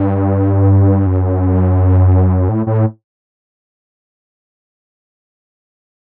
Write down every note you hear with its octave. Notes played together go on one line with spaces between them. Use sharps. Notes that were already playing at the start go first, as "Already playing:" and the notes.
Already playing: G2
F#2
A2
A2